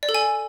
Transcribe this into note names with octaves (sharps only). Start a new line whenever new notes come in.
D5
A4
G#5